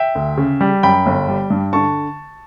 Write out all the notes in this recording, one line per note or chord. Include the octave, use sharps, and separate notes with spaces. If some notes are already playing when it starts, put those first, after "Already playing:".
Already playing: E5 G5
D2
C#3
G3
F#2 G5 B5
G1
G3
G2
D3 A5 C#6